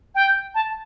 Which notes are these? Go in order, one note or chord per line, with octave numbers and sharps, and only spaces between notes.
G5
A5